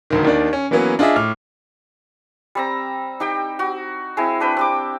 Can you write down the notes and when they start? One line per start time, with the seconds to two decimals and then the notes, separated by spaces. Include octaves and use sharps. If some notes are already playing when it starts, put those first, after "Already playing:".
0.10 E1 D2 D#3
0.25 D#2 D#3 D4 D5
0.53 C#4
0.71 E3 F#3 A#3 B3 C#4
0.99 D4 F4 G#4 D#5 E5
1.16 A2 D6 F6
2.55 G3 C4 A#5
3.20 D#4 G4 G5
3.59 F#4
4.17 G#3 C4 E4
4.40 D4 B4 G5
4.57 C4 G4 D6